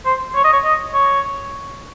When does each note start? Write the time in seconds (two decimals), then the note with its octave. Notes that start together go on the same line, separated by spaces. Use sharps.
0.05 C5
0.35 C#5
0.44 D#5
0.53 C#5
0.64 D#5
0.94 C#5